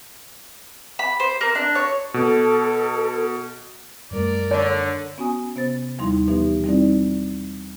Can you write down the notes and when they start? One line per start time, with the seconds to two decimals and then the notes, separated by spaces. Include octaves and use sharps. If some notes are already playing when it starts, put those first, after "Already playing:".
0.99 B5
1.20 C5
1.41 A#3
1.55 D4
1.75 C#5
2.14 B2 A4
4.11 F#2 G3 A3 A#4 D5
4.51 D3 C#5
5.18 B3 C#4 F#4 G#5 D#6
5.56 C3 B3 C5 A6
5.99 D#2 F3 G3 D#4 E4 C6
6.28 B2 E3 F3 B3 D#4 G4
6.64 G3 C4 D#4 E4 D5